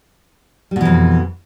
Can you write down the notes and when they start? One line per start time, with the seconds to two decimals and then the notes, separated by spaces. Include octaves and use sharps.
0.71 G3
0.76 B2
0.81 E3
0.85 F2